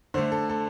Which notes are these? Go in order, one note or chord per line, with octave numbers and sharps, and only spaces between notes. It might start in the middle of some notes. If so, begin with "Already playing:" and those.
D3 A3 C5
A4
A4